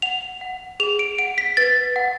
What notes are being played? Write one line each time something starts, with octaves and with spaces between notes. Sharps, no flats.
F#5 F7
F#5
G#4 F7
D7
F#5 D7
B6
B4 A6
F#5